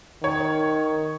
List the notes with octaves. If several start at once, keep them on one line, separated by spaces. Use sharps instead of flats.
D#3 C#5